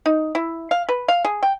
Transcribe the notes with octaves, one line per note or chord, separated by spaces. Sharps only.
D#4
E4
F5
B4
F5
G#4
G5